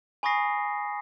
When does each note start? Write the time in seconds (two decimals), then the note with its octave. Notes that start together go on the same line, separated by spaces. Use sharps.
0.23 G#5 B5 C#6 D#6 A#6 C7